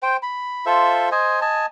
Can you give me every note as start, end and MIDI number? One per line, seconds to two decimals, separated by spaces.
0.03 0.17 72
0.03 0.17 79
0.23 0.65 83
0.66 1.09 65
0.66 1.09 69
0.66 1.09 72
0.66 1.09 76
1.12 1.40 72
1.12 1.40 75
1.12 1.40 80
1.41 1.66 75
1.41 1.66 80
1.41 1.66 81